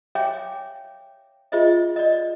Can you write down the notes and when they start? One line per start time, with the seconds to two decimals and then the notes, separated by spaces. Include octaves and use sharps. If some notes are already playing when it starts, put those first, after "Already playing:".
0.15 C#5 E5 F5 G5 G#5 D6
1.52 F4 G#4 C5 D#5 E5
1.96 D5 D#5